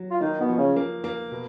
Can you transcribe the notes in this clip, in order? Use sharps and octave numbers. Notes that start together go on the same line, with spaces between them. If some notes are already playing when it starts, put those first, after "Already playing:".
Already playing: F#3
F4
D#3 A#3 D#4
B2 B3
F3
C#3 C#4
A#3
A#3
B2